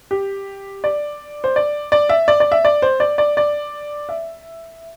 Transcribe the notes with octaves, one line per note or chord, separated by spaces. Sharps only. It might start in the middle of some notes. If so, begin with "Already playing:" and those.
G4
D5
C5
D5
D5
E5
D5
D5
E5
D5
C5
D5
D5
D5
E5